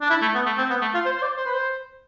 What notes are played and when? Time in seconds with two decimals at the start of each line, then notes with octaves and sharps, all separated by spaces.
0.01 D4
0.10 E4
0.22 A3
0.35 B3
0.46 A3
0.58 C4
0.70 B3
0.82 A3
0.94 F4
1.05 C5
1.18 C5
1.22 D5
1.37 C5
1.46 B4
1.54 C5